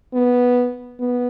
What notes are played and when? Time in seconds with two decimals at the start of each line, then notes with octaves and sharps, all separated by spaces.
0.14 B3
0.99 B3